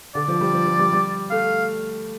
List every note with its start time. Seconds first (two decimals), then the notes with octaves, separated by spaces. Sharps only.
0.15 D3 D5
0.28 F3
0.41 G3
0.53 F3
0.67 F3
0.79 G3
0.93 G3
1.31 A3 F5